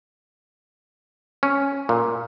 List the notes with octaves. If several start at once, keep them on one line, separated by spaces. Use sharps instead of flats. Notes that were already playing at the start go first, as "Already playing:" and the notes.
C#4
A#2